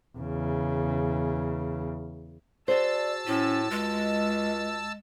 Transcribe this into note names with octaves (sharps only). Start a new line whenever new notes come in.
E2 C#3
F#4 G#4 C5 D5 A5 E6
A2 C#4
C#2 G#3